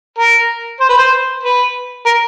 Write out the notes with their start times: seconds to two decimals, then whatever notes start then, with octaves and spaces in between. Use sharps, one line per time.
0.18 A#4
0.80 C5
0.89 B4
0.97 C5
1.43 B4
2.06 A#4